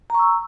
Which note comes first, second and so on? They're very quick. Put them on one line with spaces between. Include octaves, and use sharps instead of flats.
A#5 C#6 E6